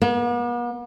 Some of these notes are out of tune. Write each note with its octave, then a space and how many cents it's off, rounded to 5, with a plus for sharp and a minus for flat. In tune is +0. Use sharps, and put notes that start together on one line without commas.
B3 -45